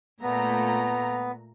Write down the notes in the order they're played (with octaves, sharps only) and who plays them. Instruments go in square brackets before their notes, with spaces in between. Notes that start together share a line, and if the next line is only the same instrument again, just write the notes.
[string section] A#2 A3 A#5 [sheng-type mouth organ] B3